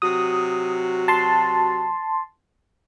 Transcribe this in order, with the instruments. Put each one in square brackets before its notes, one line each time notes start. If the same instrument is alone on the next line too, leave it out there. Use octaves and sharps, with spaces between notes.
[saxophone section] C3 F#3 F#4 [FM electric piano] D#6
[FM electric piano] A5 C6